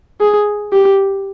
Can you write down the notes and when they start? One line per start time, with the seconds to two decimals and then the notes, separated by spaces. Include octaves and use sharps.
0.20 G#4
0.73 G4